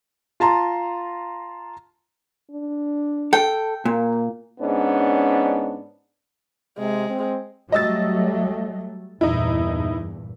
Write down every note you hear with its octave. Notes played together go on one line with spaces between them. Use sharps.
F4 A5 A#5 C6
D4
A4 G5
A#2 A#3
G#2 B3 C#4 D4
C3 G#3
C4
F#3 G3 A3 D#5 E6 A6
E2 G2 A#2 D#4 E4